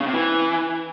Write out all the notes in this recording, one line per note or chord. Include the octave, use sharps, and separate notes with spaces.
C#3
C3
E3